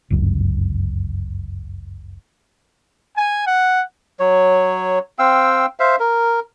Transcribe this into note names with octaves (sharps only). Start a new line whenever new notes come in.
G1 C#2 F#2
G#5
F#5
F#3 C#5
C4 F5 G5 E6
C5 E5 F5
A#4